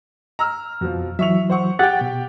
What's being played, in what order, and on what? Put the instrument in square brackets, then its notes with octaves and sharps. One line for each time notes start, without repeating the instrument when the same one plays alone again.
[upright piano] A#5 E6 F6
[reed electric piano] F2 [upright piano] B2 F3
[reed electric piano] E3 F#3 [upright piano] E5 C#6 F7
[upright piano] C5 F#5 C#6
[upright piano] G4 G5 [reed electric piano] F#5 A6
[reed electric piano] B2